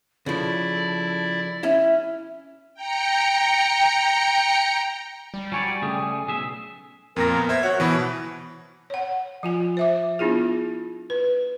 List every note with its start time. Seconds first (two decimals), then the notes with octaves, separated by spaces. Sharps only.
0.26 C#3 F3 E4 A4 D5
1.63 C#4 E4 E5
2.74 G5 A#5 C#7
5.34 G3
5.52 F#3 C#5 D5 G#5
5.82 C#3 A3 G#4
6.28 B1 G#4 E5
7.16 F2 A#2 A#4 A#6
7.37 B3
7.49 C5 E5 G#6
7.63 F#4 C#5 F#5
7.80 B2 E3 B5
8.90 C#5 F#5
9.43 F3 F4 G#5
9.77 C5 E5 D6
10.19 B3 D4 E4 F4 G#4
11.10 B4